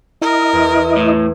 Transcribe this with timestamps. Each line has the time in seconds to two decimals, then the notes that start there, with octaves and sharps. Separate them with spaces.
0.21 E4 A#4 D#5
0.53 E2
0.96 A2